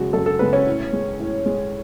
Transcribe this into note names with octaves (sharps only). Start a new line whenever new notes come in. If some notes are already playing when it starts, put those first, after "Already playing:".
Already playing: F#2 C#3 G#3 F#4
F#2 A4
A4
C#3 G#3 B4
C#4
A2
G#3
A2
G#3